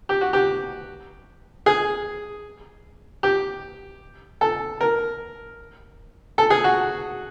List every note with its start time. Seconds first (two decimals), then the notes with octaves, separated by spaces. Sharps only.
0.09 G4
0.21 F#4
0.33 G4
1.66 G#4
3.23 G4
4.41 A4
4.81 A#4
6.38 A4
6.50 G#4
6.64 F#4